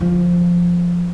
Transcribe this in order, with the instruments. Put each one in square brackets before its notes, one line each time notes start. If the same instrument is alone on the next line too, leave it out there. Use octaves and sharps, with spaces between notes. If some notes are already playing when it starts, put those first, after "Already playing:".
[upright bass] F3